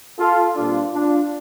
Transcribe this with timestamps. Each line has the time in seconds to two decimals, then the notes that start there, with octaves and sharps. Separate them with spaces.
0.19 F4 A4
0.56 A#2 G3 C4 D4 F4
0.93 D4 F4